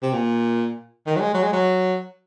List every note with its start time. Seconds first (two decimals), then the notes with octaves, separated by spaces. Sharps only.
0.03 C3
0.14 A#2
1.07 D#3
1.16 F#3
1.20 G#3
1.34 F#3
1.43 G#3
1.53 F#3